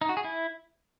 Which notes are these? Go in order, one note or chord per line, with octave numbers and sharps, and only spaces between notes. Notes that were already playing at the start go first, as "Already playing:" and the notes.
D#4
F#4
G#4
E4